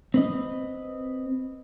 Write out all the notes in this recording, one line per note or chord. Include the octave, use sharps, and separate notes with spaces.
C4 B4 D#5